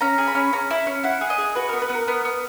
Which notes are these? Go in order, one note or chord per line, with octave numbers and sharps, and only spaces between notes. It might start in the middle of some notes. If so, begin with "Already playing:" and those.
C#4 A#5
G#4
B5
C#4
C#4 A#5
E4
C#4
E4 F#5
G#4
D#5
G#4
F#4 B4
B3 A#4
B4
B3
A#4
B3
B3